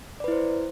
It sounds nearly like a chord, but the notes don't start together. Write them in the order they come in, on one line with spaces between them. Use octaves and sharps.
D5 B4 E4 C5